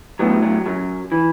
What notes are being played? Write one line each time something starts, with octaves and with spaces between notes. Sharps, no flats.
A2 F#3 B3
F#3
F#2 F#3
E3